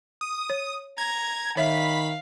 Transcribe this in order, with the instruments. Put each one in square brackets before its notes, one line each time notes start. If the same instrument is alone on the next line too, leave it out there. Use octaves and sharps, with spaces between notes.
[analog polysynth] D#6
[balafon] C#5
[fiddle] A#5 [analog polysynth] G#6
[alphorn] D#3 [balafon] C#5 E5 [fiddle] F5 [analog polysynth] B5 B6